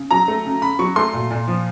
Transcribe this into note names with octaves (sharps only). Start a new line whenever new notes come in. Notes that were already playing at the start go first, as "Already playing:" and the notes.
Already playing: C#3
F#3 A#5
A3
C#3
C#3 B5
F#3 C#6
A3 C6
A#2
A#2
F3